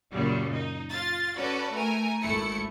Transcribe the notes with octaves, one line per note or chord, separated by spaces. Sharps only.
F#2 A#2 C#3 F#3 G3
D#4
F4 A6
C#4 F#4 A4 B4 D5
A3 A#4 G#5
G#1 A3 E4 C#7